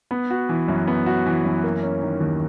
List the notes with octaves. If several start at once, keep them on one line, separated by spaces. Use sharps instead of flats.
B3
F#4
E3
F#2
B3
F#4
E3
F#2
A#3
C#4
D#3
D#2